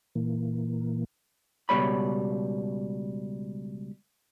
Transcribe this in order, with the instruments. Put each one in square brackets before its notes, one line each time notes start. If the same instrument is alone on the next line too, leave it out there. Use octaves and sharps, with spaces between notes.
[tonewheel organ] A#2 E3 A#3
[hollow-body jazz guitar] C#2 B2 G3 G#3 C#5 B5